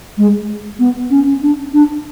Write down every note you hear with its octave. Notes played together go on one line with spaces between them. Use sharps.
G#3
B3
C#4
D4
D4